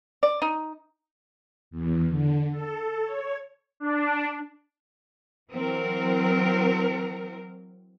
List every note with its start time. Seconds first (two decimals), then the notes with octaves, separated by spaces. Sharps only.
0.23 D5
0.42 D#4
1.71 E2
2.09 D3
2.51 A4
3.04 C#5
3.80 D4
5.52 E3 F#3 C4 A#4